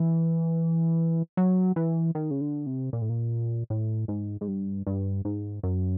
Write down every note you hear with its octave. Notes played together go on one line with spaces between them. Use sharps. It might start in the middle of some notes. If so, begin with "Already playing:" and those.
Already playing: E3
F#3
E3
D#3
C#3
D3
C3
A#2
A2
A#2
A2
G#2
G#2
G2
G2
G#2
F#2